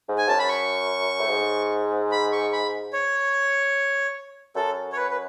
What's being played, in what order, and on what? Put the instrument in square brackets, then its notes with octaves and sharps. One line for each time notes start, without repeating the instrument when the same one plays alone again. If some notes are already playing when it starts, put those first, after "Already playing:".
[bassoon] G#2
[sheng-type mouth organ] G#5
[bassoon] F#2 [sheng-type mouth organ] A5
[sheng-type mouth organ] B5
C#6
[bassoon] A2
G#2
[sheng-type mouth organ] B5
C#6
B5
C#5
[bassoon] F#2 [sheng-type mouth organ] A4
[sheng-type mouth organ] C#5
B4
B4